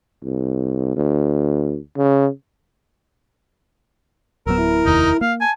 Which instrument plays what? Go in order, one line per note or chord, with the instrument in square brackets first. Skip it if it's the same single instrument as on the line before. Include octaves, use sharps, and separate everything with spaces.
[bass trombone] C2
D2
C#3
[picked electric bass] D1 F#3 B3 [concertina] A#4 [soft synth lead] E6
[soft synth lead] E4
[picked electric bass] F1 D#2 [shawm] D#4
[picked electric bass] A#3 [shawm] F5
[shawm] G#5 [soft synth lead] A5